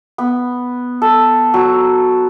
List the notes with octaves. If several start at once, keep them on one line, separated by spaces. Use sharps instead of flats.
B3
A4
F#3